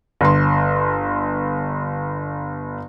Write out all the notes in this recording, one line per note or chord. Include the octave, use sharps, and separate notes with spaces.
G1 C6